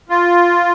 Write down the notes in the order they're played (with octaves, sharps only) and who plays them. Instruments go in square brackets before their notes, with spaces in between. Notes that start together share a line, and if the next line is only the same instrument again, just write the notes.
[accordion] F4